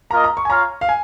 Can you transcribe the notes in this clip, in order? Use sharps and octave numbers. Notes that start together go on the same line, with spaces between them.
A#3 F4 A#4 D#5 A#5
A#5
C#6
G#5
F4 C#5 F5 A#5
F5
G#5